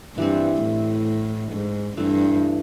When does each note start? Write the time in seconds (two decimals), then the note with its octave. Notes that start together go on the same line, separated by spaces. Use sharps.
0.17 G2 E3 G3 C4
0.62 A2
1.52 G#2
1.97 G2 E3 A3 C4 E4